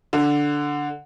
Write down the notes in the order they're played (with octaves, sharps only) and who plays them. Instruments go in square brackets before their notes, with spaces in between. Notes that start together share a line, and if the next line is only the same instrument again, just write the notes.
[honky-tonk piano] D3